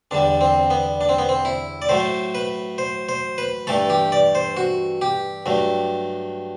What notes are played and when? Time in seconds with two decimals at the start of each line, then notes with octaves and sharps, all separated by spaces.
0.11 E2 D3 G3 D4
0.41 C4
0.70 B3
1.01 D4
1.09 C4
1.19 B3
1.29 C4
1.45 E4
1.82 D5
1.89 A2 F#3 A3 C5
2.35 B4
2.78 C5
3.09 C5
3.38 B4
3.67 G2 E3 A3 A4
3.90 G4
4.12 D5
4.35 C5
4.57 F#4
5.02 G4
5.46 G2 F#3 A3